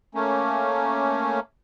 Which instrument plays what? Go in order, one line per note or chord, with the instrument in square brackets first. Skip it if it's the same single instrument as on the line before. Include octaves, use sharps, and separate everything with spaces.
[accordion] A3 A#3 C#4